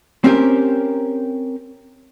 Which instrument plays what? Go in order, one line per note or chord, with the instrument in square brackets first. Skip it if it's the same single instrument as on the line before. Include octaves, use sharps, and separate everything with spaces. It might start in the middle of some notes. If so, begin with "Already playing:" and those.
[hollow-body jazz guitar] C4 C#4 G4 A#4